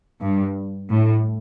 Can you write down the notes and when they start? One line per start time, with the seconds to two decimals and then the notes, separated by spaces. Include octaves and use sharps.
0.21 G2
0.90 A2